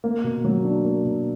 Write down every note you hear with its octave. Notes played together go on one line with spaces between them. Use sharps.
A#3
B2
F#3
D4
A#3
B2